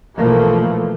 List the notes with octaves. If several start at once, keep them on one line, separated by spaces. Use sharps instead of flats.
B1 B2 E3 F3 A3 A#3